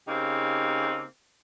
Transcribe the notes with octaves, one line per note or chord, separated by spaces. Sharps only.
C#3 A#3 C4 D#4 G4